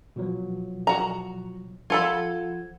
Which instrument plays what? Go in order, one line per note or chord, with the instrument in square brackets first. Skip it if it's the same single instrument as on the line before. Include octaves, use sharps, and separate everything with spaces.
[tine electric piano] B2 F3 F#3
[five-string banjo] F#4 A#5
[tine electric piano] F3 F#5 G#6 [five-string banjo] F4 A4 B5